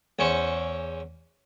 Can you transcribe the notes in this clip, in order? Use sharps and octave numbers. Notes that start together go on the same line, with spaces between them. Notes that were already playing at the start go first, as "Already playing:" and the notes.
E2 C#4 C5 C#6